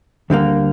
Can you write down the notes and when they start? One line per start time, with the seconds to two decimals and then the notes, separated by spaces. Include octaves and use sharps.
0.30 D2 D3 G3 A#3